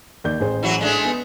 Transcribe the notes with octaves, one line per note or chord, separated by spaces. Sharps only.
D#2 D5 G6
A1 G#4 C5
E3 F#3 F#4
G#3 A3 D4
B3